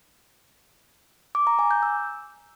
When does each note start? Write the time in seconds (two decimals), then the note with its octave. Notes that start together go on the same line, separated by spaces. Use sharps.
1.35 D6
1.47 A#5
1.59 G#5
1.71 G6
1.83 E6